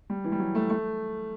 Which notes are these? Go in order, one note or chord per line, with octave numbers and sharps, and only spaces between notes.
G3
E3
G3
F#3
A3
A3